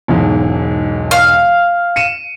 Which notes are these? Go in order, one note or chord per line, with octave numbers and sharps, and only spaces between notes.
E1 B1 G#2
F5
C#7 D#7 E7